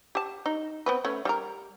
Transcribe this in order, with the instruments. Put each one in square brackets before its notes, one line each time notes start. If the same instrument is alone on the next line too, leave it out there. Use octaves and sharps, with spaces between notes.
[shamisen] G4 A5
D#4
B3 C4 B4
A3 C#4
G3 G4 A#4